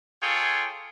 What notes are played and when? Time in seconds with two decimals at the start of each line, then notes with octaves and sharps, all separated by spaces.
0.21 F4 G#4 A4 C#5 G5